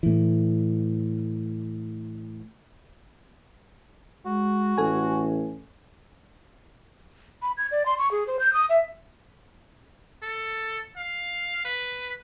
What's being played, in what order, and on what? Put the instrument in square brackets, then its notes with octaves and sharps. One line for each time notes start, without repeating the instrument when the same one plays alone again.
[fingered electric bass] A2 E3
[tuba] G#3 [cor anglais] F#4
[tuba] A1 [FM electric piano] A4 G#5
[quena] B5
G#6
D5
C6
C#6
G#4
C5
G6
D#6
E5
[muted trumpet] A4
F5
B4